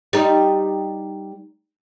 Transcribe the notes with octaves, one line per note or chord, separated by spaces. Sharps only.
G3 D#4